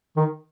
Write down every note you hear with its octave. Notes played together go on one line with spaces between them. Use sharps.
D#3